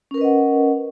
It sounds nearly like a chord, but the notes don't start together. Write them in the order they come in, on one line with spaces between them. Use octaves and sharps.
C#4 A#4 B4 D#5 F#5